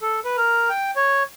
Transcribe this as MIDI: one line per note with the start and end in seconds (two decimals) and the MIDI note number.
0.01 0.20 69
0.25 0.36 71
0.37 0.69 70
0.69 0.91 79
0.96 1.23 73